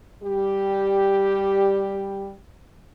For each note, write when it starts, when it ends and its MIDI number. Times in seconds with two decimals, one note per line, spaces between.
0.23 2.34 55
0.23 2.34 67